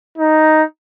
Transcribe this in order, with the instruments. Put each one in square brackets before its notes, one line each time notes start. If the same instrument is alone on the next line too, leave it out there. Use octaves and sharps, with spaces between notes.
[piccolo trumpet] D#4